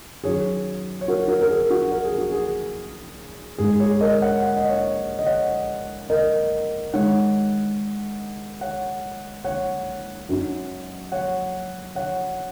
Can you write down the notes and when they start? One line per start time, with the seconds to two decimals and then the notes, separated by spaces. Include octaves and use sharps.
0.24 F#2 D#3 F#3 G#4 C#5
1.01 C#5
1.08 F#4 A#4
1.28 F#4 A#4
1.41 A#4
1.49 G#4
1.70 F#4
1.92 A#4
2.05 G#4
2.18 F#4
2.32 G#4
3.58 G#2 G#3 D#4 G#4
3.80 G#4 C#5
4.01 A#4 D#5
4.13 D#5
4.22 C#5 F#5
4.42 F#5
4.57 D#5
4.70 C#5 F#5
5.19 D#5
5.26 C#5 F#5
6.10 A#4 D#5
6.93 D#3 G#3 D#4 C#5 F#5
8.61 C#5 F#5
9.45 C#5 F#5
10.29 F#2 F#3 D#4
11.12 C#5 F#5
11.95 C#5 F#5